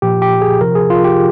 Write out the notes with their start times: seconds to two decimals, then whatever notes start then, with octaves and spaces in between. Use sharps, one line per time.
0.02 A#2 F3 G4
0.22 G4
0.42 G#4
0.61 C3 F3 A#4
0.75 G#4
0.90 F4
1.04 G4